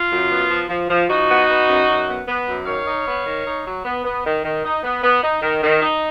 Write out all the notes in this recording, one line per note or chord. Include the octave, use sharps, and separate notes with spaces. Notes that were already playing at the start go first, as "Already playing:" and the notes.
Already playing: F4
F#2
B3
F3
F3
F3
F3 D#4 F#4
B3
B3
F#2
F#2
B3
B3
F#2
D#3 C#5 F5
D#4
B3
D#3
D#4
F#3
B3
B3
D#3
D#3
D#4
B3
B3
D#4
D#3
D#3
D#4